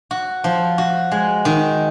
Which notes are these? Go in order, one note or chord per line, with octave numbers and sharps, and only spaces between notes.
F#4
F3
F#4
G#3
D#3